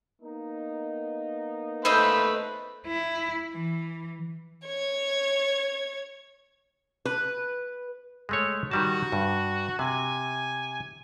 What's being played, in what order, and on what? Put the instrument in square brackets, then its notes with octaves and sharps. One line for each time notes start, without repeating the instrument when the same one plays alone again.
[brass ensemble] A#3 B3 D#4
[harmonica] A3 B4 [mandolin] C5 D#5 E6
[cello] E4
E3
[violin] C#5 G#6
[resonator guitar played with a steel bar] B4
[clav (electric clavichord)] G#3 A3 C#5
[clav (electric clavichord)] D#3 G3 A5 [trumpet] F#4
[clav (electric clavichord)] G2
[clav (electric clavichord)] C3 [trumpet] G#5